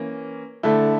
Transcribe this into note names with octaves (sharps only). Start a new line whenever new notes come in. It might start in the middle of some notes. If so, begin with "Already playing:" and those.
Already playing: E3 A#3 C#4
D3 A3 E4 A4